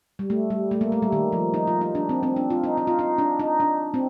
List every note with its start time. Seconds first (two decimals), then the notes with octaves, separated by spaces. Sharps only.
0.19 G3
0.30 A3
0.50 G3
0.71 A3
0.81 A#3
0.92 A3
1.02 G3
1.12 D#3
1.32 F3
1.54 D#4
1.67 F4
1.81 D#4
1.95 D4
2.09 C4
2.23 C4
2.36 D4
2.50 F4
2.64 D#4
2.78 D#4
2.87 F4
2.99 D#4
3.18 D4
3.40 D#4
3.60 D4
3.94 C4